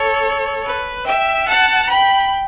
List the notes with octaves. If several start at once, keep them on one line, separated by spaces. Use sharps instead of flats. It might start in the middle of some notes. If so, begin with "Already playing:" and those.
Already playing: A4 C#5
B4
E5 G5
F#5 A5
G5 B5